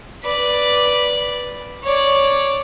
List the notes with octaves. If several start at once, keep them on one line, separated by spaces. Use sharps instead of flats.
B4 D5
C#5 D5